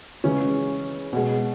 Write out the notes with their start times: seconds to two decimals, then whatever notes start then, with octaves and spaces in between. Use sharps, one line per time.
0.24 C#3 E3 G#3 C#4
1.13 B2 G#3